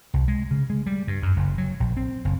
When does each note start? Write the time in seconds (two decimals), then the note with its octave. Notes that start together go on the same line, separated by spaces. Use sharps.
0.14 C2
0.28 G#3
0.51 C#3
0.70 G#3
0.86 G3
1.07 G2
1.22 F#2
1.36 F#1
1.58 F#3
1.80 A#1
1.97 C4
2.25 F#1